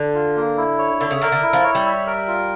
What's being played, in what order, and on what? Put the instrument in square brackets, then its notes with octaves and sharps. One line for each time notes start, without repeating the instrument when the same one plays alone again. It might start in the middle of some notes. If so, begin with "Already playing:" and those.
Already playing: [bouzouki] D3
[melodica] F4
A#3
E4
C#5
[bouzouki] D3 [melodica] E5
[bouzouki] C#3
[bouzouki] D3 [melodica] A#4
[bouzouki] D3
[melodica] E4
[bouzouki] F3
[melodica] C#5
[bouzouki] G3
[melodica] E5
A#4
F4